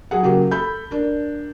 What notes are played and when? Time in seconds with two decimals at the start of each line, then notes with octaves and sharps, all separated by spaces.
0.11 F#3 G#4 F#5
0.23 C#3 F#3 A#3 F#4 G4
0.51 A4 B5 G6
0.91 D4 A#4